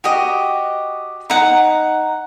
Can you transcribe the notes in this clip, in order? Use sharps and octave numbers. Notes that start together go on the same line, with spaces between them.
F#4 G4 D#5
D#4 F#5